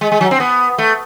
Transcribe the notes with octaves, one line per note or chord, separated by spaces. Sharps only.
G#3
G#3
F#3
C4
B3
A3